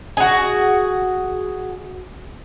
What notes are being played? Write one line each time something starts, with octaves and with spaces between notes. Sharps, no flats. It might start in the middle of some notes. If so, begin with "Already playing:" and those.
F#4 G#4